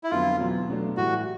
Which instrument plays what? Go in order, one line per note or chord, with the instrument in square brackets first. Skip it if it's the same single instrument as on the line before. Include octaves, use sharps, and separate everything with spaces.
[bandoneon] E4
[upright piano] F2 D3 F#3 B3 [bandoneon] F4
[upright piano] E2 B2 F#3
B2 F#3 A3 D4
[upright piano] A2 E3 G3 [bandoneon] F#4